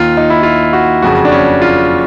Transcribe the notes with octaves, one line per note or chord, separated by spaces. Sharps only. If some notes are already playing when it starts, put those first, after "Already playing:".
Already playing: D#2 D#3 F4
D#4
E4
F4
F#4
F#1 F2 C#3 F#4
D4
C#4
F4